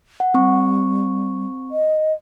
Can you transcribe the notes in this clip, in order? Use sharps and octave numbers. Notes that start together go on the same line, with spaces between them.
F#5
G3 C4 C#6
D#5